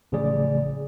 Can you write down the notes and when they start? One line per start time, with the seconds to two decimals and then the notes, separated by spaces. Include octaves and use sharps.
0.12 A1 C#3 F3 A3 G#4 D5